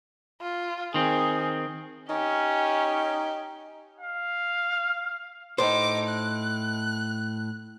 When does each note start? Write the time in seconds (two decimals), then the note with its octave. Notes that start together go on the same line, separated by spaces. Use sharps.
0.41 F4
0.94 D#3 C4 G#4
2.10 C#4 D#4 G4
4.01 F5
5.58 A2 D#4 C5 D6
6.09 F#6